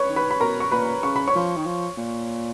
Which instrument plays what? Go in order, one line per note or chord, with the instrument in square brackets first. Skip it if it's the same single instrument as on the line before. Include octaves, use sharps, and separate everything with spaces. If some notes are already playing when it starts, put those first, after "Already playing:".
Already playing: [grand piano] B4 C#5 B5 C#6
[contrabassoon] D#3
[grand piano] B4 B5
B5
[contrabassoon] B2 [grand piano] A#4 A#5
[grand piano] C#6
[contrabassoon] A#2 [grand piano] B4 B5
[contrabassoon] C#3 [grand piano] C#6
[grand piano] B5
C#5 C#6
[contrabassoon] F3
D#3
F3
A#2